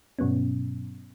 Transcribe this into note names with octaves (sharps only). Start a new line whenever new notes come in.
G2 B2 F#3 B3 C#4